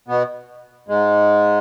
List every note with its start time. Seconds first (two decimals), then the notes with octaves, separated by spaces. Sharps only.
0.08 B2 B3
0.88 G#2 G#3